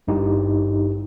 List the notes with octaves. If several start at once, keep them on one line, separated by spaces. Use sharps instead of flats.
G#1 G2 D#4 E4 G4